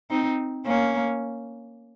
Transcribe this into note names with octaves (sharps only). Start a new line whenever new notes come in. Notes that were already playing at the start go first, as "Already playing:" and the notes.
C4 D#4
A#3 C#4